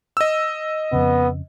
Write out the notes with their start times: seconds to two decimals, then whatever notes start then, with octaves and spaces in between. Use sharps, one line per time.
0.17 D#5 E6
0.93 F2 C#3 B3